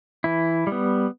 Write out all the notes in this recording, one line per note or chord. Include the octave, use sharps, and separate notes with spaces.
E3 E4
G3
B3